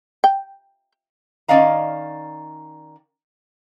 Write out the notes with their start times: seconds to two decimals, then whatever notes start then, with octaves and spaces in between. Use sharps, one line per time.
0.24 G5
1.48 D#3 C#4 D5 D#5 F5 A#5